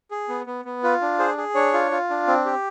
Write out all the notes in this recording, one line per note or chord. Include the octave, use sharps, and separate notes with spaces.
G#4
B3
B3
B3
F4 B4
D4
G#4 C5
G#4
D4 C#5
F4
F4
D4
C4
G4